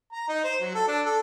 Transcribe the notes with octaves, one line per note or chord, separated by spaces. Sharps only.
A#5
D#4
C5
F#3
A4
D4
A4